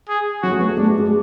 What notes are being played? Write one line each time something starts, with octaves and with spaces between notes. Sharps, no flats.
G#4
F#3 F#4
A3
B3
A3
G#3 D4
G#3
G#3